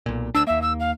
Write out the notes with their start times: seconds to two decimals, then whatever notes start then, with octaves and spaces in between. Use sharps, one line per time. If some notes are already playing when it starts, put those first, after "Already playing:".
0.06 B1 A#2
0.35 D2 D4 E6
0.47 D#2 A#3 E5
0.62 E6
0.80 F5